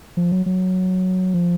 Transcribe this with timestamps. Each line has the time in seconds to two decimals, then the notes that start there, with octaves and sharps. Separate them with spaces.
0.17 F3
0.32 F#3
0.46 F#3
1.34 F3